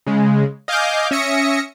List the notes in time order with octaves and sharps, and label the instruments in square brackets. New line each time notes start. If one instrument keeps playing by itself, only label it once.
[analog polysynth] C#3 G#3
D#5 F5 G#5 D6 F6 G6
C#4 E5 D#6 A#6 C#7